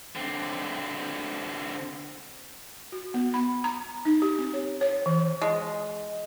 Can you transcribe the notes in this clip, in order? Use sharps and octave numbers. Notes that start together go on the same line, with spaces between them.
D3 C4
F#4
B3
B5
A#5
D#4
G4
C4
C#5
C#5
E3
G#3